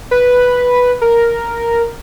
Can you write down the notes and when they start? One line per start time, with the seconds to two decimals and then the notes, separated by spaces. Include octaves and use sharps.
0.11 B4
1.02 A#4